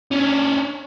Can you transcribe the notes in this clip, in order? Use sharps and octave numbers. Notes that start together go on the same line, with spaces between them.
C#4 D4